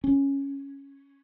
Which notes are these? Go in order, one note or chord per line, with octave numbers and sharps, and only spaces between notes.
C#4